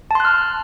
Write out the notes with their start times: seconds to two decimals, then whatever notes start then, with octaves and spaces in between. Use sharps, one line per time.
0.11 A5
0.15 C6
0.20 F#6
0.25 F6